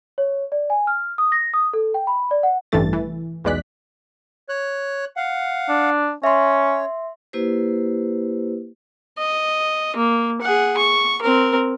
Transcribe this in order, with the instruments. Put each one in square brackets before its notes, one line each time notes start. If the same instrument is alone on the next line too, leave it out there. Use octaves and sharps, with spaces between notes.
[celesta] C#5
D5
G#5
F6
D#6
A#6
D#6
A4
G5
B5
D5
F#5
[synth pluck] A1 G2 C3 E3 A3 A6
E3
B1 E2 G#3 D5 F#6 B6
[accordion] C#5 F#6
F5 F#5
[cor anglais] D4
[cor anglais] C#4 [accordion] C#5 [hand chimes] E5 C6
[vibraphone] A#3 E4 G4 B4 C5
[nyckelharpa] D#5
A#3
G#4 F#5
C#6
C4 A#4